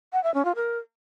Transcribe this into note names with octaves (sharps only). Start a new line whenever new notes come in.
F#5
E5
C#4
F4
A#4